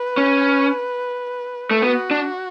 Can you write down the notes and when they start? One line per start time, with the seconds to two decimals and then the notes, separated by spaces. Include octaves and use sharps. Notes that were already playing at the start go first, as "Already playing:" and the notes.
Already playing: B4
0.17 C#4
1.71 A3
1.82 B3 F#4
2.11 D4